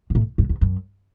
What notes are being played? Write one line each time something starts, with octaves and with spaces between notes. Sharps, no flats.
G#2
A2
F#2
E2
F#2